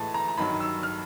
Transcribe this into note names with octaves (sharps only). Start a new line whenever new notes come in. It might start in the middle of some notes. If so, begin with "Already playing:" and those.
Already playing: A2 E3 G#3 A5
A#5
A#5
G2 D#3 F#3 B5
E6
F6